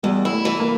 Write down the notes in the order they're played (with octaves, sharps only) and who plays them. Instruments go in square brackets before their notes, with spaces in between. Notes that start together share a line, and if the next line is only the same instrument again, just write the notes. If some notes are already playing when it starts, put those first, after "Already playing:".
[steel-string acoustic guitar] E2 [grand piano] G3
[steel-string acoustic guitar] E4
[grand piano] A3
[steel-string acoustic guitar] E3
[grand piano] A#3